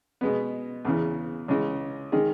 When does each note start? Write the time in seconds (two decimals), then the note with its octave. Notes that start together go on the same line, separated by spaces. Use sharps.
0.21 B2 G#3 B3
0.85 E2 C#3 E3
1.48 C#2 C#3 E3 G#3
2.12 D#3 G#3 D#4 G#4